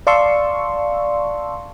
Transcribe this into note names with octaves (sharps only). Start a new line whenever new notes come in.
D5 F5 A5 C6 C#6 E6